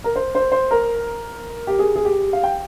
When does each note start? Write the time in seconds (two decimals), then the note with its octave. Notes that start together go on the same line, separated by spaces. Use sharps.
0.04 A#4
0.16 C5
0.35 C5
0.52 C5
0.71 A#4
1.67 G4
1.79 G#4
1.96 G#4
2.05 G4
2.33 F5
2.43 G5